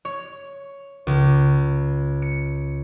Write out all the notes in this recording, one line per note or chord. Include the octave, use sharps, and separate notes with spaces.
C#5
C#2
C#7